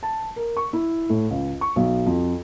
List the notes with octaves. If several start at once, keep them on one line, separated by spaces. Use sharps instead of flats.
A5
A#4
C#6
E4
A2
C#2
C#6
B1
F2